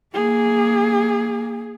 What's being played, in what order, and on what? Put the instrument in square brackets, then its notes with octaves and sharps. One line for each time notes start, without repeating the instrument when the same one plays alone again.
[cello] A#3 [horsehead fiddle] G#4